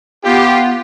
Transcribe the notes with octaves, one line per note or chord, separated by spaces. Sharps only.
B3 F4 G4